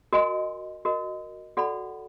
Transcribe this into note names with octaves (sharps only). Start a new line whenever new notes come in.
F#4 A#4 D#5 G#5 C6
F#4 A#4 D#5
F#4 A4 D5 F#5 B5